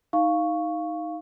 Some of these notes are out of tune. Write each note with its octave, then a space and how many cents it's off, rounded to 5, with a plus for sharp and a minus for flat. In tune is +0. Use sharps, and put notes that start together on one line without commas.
D#4 +10 F5 +0 C#6 +0